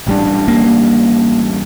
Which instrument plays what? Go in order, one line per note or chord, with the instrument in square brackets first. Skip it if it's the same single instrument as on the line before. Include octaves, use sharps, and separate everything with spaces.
[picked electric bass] A1 G3 D4
[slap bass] A#3